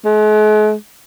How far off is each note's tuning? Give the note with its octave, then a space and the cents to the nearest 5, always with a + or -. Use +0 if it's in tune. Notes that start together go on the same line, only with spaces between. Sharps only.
G#3 +45